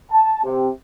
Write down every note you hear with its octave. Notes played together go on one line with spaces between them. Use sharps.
A5
C3